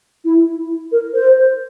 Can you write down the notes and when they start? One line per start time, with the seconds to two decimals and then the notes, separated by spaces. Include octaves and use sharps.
0.25 E4
0.92 A#4
1.14 C5